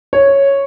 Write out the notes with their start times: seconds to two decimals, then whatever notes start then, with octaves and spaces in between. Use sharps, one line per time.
0.13 C#5